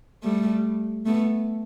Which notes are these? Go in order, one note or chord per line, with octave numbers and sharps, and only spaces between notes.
G3 A3
A3 B3